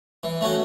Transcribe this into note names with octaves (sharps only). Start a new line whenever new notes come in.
E3
A3 C#4 F#4